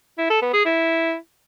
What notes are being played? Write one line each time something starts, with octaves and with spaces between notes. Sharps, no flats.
E4
A4
B3
G#4
E4